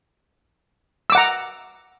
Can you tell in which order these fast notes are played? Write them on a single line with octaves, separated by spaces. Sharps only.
E6 D6 F#5 A#5